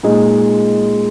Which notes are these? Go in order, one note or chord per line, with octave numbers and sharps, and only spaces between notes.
A#2 G#3 D#4